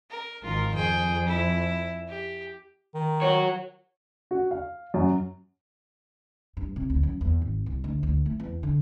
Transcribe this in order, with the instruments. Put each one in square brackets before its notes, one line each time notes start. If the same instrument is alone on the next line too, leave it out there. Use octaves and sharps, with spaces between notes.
[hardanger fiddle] A#4
[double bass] G#1 D#3 [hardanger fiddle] F4 A#4
[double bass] F2 [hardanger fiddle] G#4 G5
[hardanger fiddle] E4
G4
[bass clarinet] D#3
[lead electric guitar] F#4 C#5
[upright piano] F#4
F5
F#2
[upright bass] G2
C3
D2
F#2
E2
G#1
C2
D2
D2
A3
E2
D3